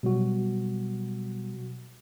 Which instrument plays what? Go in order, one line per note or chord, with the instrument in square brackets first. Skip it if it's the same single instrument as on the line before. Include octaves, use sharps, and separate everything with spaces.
[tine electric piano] B2 F#3 G3 F#4